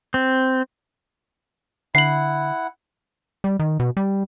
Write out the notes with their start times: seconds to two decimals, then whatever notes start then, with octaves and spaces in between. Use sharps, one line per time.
0.14 C4
1.95 D3 E4 F#5 C7 F#7
3.44 G3
3.59 D#3
3.80 B2
3.97 G3